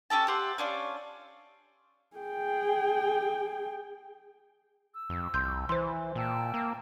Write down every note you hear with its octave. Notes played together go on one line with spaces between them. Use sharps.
C#4 G4 A4 A5
G4 C5 E5 F#5
C#4 D4 F4
G#4 G5
E6
F2
C2 C6 G6
E3 C5 C6
A#2 G5 A5 E6
A#3